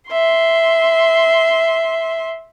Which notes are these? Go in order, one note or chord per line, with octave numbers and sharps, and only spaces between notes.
E5 C6